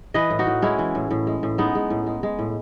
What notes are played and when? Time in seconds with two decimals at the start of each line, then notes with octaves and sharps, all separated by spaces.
0.14 E3 B4 D#5
0.30 A2
0.39 D#4 F#4
0.47 A2
0.62 G#3 C#4 E4
0.79 E3
0.95 A2
1.11 A2
1.27 G#3
1.43 A2
1.58 G#3 B3 D#4
1.75 G#3
1.90 A2
2.07 G#3
2.23 G#3
2.39 A2